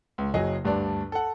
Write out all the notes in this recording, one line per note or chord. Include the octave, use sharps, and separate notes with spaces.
C#2
F#1 F#3 G#4 D#5
D2 G2 D4 D5
A4 F#5